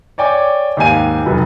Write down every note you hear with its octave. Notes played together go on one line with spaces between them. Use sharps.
C#5 D5 G5 G#5 D6
D#2 G#2 G4 F5 G#5 D#7
F1 F#3 A4 B4